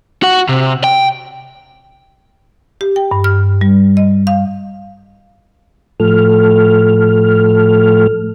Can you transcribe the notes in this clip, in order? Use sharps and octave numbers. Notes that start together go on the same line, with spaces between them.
F#4 F#5
C3
G5
G4
G5
G2
F6
G3
D#5
F5
A2 F3 A3 A4 F6